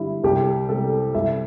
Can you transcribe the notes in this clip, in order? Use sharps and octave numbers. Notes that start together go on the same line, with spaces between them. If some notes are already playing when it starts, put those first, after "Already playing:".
Already playing: G2 D3 G3 E4
C2 G4
C3 G3 A4
C2 E5